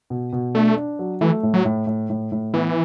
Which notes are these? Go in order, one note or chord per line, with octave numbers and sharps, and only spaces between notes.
B2
B2
A3 D4
D4
F#3
E3 A3
A2
F#3
A2
A2
A2
A2
E3 B3